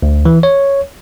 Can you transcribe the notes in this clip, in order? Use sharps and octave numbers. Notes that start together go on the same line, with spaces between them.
D2
E3
C#5